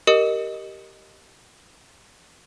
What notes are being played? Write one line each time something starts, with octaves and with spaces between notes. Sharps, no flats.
G4 A#4 D#5 D#6 C#7